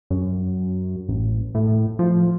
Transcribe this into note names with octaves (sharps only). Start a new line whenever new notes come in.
F#2
A1
A2
F3